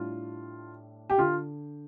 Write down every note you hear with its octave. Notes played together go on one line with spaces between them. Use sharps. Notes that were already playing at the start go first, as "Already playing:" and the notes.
Already playing: A2 G3 D4 F4
G4
D3 F4